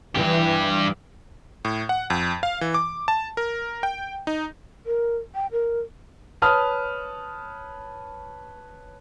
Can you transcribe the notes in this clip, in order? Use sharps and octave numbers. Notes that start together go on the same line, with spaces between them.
G2 E3 G4
A2
F#5
F2
F5
E3
D6
A5
A#4
G5
D#4
A#4
G5
A#4
B4 C#5 A5 D#6 F6